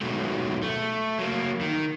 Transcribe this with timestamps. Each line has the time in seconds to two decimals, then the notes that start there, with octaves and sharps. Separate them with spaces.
0.01 B2 D#3 F#3 G#3 A3
0.62 A3
1.19 F#3 A#3
1.61 D#3